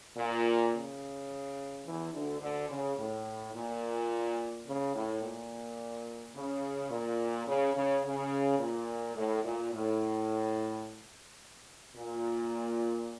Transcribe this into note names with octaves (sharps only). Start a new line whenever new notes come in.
A#2
C#3
E2 E3
D2 D3
D2 D3
C#3
A2
A#2
C#3
A2
A#2
C#3
A#2
C#3
C#3
C#3
A#2
A2
A#2
A2
A#2